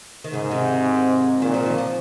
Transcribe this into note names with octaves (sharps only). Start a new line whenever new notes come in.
D#3
G#2 C#3
C3 D#3
A#2 D#3
F3
D#3
F3